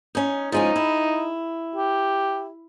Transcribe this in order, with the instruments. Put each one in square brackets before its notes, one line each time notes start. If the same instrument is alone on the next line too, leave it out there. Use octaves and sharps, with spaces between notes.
[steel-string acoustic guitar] C#4 D#4
[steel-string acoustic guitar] F3 G#3 C#4 [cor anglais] D#4
[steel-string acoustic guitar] E4
[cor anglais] G4